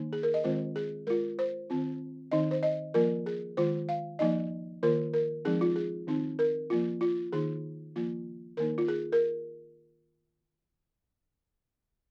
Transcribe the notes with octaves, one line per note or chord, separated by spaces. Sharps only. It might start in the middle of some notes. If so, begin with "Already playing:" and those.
Already playing: D#3 A#3 D#4
G#4
A#4
D#5
D#3 G#3 C4 F4 C5
G#4
G#3 F4 A#4
C5
D#3 C4 F4
D#3 C4 D#4 D#5
C5
D#5
F3 A#3 F4 A#4
G#4
D#3 G#3 F4 C5
F5
F3 A#3 D#4 D#5
D#3 A#3 F4 A#4
A#4
F3 G#3 C4 D#4 G#4
F4
G#4
D#3 C4 D#4
A#4
F3 A#3 F4
F4
D#3 A#3 D#4 G#4
F3 A#3 F4
D#3 A#3 D#4 A#4
F4
G#4
A#4